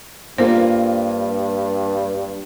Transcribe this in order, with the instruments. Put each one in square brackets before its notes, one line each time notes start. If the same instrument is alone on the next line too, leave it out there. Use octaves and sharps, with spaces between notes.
[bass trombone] G2 [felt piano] A#3 F4 [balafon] C5